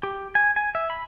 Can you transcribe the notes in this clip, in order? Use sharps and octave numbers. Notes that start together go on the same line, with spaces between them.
G4
G#5
G#5
E5
B5